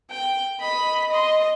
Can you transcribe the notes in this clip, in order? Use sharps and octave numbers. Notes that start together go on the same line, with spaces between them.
G5
D#5 B5
D#5 C6